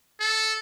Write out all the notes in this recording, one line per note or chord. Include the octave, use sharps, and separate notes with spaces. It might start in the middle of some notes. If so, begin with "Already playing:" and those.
A4